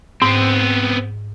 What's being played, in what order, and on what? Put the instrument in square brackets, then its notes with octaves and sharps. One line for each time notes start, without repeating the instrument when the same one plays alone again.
[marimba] G#2 [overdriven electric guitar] B3 C4